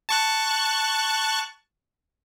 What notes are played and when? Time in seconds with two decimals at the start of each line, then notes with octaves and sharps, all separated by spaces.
0.09 A5 C#6 F#6